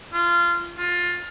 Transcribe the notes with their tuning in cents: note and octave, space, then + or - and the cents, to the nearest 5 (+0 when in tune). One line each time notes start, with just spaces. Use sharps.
F4 -20
F4 +20